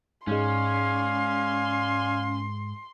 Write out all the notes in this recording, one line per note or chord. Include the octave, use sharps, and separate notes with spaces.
G#2 G#3 C#4 D5 F5 G#5 C6